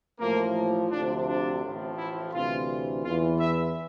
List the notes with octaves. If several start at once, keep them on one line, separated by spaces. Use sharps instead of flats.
A1 A2 F3 A#3
D2 C3 F3 D4
D4
A1 A2 F3
E4
D2 C3 E3 F4
E2 E3 F4
E5